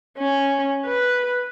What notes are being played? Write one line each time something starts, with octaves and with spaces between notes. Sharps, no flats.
C#4
B4